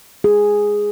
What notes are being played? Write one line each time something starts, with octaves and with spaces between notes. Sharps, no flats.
G#4